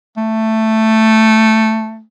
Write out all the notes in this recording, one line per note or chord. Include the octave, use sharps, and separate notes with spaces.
A3